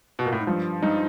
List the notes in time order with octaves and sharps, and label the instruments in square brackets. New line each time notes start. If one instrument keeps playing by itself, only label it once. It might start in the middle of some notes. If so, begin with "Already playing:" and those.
[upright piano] B2
A#2
A2
G#2
[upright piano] G2 [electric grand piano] F3
[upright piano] G2 [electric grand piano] D#4